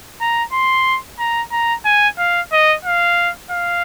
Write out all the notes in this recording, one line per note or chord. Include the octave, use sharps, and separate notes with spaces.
A#5
C6
A#5
A#5
G#5
F5
D#5
F5
F5